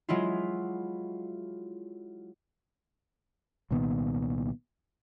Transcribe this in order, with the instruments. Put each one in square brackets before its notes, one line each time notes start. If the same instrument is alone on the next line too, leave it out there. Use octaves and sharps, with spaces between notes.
[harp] F#3 G#3 E4 F4
[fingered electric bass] C2 A#2 D#3 B3